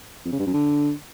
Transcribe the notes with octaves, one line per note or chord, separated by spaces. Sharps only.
F2
C#3
G2
F#2
D3